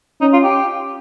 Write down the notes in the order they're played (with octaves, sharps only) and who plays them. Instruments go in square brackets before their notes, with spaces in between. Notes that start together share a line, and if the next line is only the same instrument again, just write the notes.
[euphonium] C#4 [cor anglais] D#4
[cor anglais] F4
G4